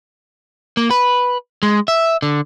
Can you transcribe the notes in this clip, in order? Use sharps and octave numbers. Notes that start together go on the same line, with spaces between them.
A#3
B4
G#3
E5
D3